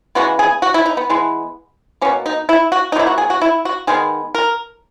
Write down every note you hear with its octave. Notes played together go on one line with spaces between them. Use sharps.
C#3 E3 G#3 B3 F#4
G#4
F#4
E4
D#4
B3
E3 G#3 B3
B2 A#3 C#4
D#4
E4
F#4
D#4
B2 F#3 A#3 E4
F#4
G#4
F#4
E4
F#4
D#3 G#3 B3 G#4
A#4